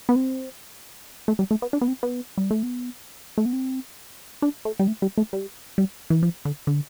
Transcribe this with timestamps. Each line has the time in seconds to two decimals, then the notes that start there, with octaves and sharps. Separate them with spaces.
0.09 B3
0.16 C4
1.28 A3
1.39 G3
1.51 A3
1.62 B3
1.73 D4
1.81 B3
1.88 C4
2.03 B3
2.38 G3
2.51 A3
2.63 B3
3.38 A3
3.45 B3
3.53 C4
4.42 D4
4.65 A3
4.80 G3
4.87 A3
5.02 G3
5.18 A3
5.33 G3
5.78 G3
6.10 E3
6.23 F3
6.45 D3
6.67 D3